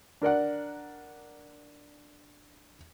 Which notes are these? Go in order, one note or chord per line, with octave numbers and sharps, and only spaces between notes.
D4 A#4 D5 F#5